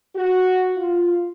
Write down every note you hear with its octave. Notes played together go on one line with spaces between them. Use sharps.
F#4
F4